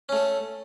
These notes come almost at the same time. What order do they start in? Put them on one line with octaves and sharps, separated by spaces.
C#4 A3 A4